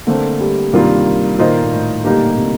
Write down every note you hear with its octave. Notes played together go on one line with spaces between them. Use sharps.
D3 A3 A#3 C4
G3
G2 C3 D#3 A#3 F4
A#2 D#3 A#3 F4 C5 D#5
A#2
A2
A#2 D3 G3 A#3 D#4 G4
C3